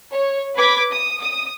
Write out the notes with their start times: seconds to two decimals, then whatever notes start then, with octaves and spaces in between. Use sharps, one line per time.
0.12 C#5
0.55 B4 D6 G#6 B6
0.91 D#6
1.22 D#6